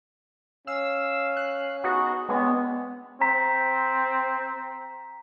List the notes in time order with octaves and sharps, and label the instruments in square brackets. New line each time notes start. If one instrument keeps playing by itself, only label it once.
[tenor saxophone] C#4 [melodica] F5 [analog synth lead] E6
[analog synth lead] F#6
[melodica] B3 D#4 G#4 [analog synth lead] F#4
[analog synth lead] G#3 [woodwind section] B3 [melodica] C4 D4 C#5
[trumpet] C4 [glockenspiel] A#5 B6